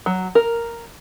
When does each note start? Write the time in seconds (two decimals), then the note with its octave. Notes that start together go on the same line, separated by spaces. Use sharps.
0.06 F#3
0.35 A#4